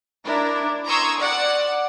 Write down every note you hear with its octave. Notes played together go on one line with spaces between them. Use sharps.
D4 E4 A#4
A#5 C6 C#6 D#6 E6 G#6
D5 F#5